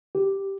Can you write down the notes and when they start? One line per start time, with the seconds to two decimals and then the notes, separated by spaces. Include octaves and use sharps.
0.15 G4